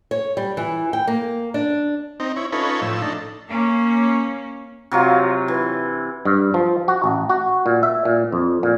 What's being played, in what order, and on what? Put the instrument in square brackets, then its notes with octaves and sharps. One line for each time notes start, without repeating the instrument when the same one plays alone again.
[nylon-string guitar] C#5
G3
E3
G5
A#3
D4
[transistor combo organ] C4 D#4
E4 C#5
C#4 D#4 F4 A4 B4 C#5
A2 F3 E6
D4 D#4 A4
[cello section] A#3 C#4
[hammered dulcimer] C3 F#3 F4
E3
[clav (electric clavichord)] G2
F3
F#4
A1
F#4
A#2
E5
A#2
F2
A#2